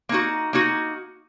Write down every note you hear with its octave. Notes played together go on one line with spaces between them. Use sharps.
A#3 D#4 F#4
A#3 D#4 F#4